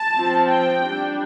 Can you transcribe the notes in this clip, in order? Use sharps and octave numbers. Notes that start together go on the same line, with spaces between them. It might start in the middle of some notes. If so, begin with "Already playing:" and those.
Already playing: A5
F3 C4
G5
G3 D4